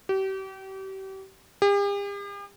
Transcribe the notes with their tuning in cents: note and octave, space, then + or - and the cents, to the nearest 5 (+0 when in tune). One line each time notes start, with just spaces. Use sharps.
G4 -35
G4 +45